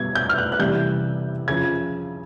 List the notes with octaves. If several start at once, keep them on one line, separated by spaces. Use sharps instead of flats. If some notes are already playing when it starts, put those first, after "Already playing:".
Already playing: B2 G3 G#6
G6
F6
F#6
F#6
C3 E3 G3 G6
C#3 F3 G#6